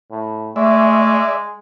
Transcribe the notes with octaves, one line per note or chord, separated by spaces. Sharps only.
A2
G#3 A3 D5 E5